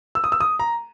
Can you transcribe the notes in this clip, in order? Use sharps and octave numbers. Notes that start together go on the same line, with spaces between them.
E6
D#6
E6
D#6
A#5